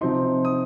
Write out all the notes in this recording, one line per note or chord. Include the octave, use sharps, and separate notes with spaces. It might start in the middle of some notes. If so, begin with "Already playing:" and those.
C3 F3 C4 D#4 C6
D#6